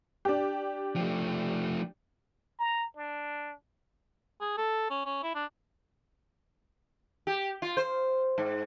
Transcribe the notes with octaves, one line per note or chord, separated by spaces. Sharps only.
D4 G4
F3 A3
A#5
D4
G#4
A4
C#4
C#4
E4
D4
G4
F4
C5
G#2